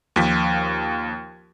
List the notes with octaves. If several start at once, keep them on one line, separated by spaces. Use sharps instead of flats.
D#2 F3 B6